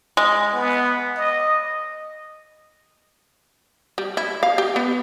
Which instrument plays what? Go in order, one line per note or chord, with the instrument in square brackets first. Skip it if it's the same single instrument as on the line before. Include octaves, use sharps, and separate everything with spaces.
[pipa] G#3
[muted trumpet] B3
D#5
[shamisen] G3
E4
F5
G4
B3